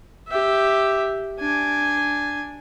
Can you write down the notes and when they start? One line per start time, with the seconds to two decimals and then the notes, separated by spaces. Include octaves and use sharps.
0.28 G4 E5
1.40 D4 G#5